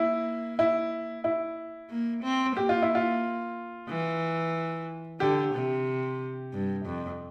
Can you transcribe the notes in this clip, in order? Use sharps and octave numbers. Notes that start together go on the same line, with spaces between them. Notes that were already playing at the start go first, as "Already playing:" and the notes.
Already playing: A#3 E4
E4
E4
A#3
C4
A#3 G4
F4
E4
F4
E3
D3 G4
C3
G2
F2